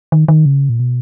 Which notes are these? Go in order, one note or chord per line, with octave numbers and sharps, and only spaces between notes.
D#3
D#3
C#3
A#2
B2